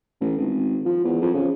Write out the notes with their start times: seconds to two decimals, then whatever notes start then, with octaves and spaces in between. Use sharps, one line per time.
0.20 A1
0.38 G#1
0.85 F3
1.04 E2
1.22 F2
1.34 C#3